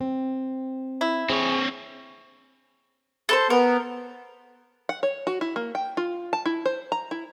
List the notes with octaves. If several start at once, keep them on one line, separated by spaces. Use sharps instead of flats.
C4
E4
C4 G#4 C#5
A4 B4 C5
B3 A#4
F#5
C#5
F#4
E4
A#3
G5
F4
A5
E4
C5
A#5
E4